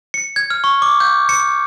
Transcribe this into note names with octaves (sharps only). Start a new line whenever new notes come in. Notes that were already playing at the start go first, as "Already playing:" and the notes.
C#7
G#6
F6
C#6
D6
G6
C#7